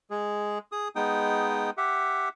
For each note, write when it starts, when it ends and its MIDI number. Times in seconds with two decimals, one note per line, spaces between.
0.11 0.58 56
0.11 0.58 68
0.72 0.88 68
0.72 0.88 87
0.96 1.70 56
0.96 1.70 59
0.96 1.70 63
0.96 1.70 79
0.96 1.70 87
1.77 2.29 67
1.77 2.29 76
1.77 2.29 78